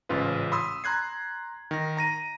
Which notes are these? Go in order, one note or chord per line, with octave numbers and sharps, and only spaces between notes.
A1 G#2 C#3 F4 B4
B5 C6 D#6 E6
A#5 C6 F#6 G#6 C7
D#3 A#6
A#5 A#6 D#7